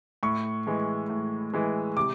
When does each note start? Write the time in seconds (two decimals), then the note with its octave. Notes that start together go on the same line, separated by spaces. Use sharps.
0.23 A2 C#6
0.67 E3 G#3
1.10 A2
1.54 E3 G#3
1.97 C3 D6